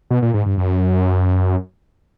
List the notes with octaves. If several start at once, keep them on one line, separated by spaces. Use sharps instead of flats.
B2
A#2
G#2
G2
F#2